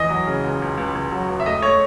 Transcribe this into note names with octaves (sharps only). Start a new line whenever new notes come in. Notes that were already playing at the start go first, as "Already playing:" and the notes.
Already playing: E3 D#5
F#3
C#3
C#2
C#2
C#2
C#2
F#3
C#2
E5
A3 D#5
A3 C#5